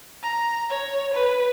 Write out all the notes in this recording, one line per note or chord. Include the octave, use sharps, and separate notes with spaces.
A#5
C#5
B4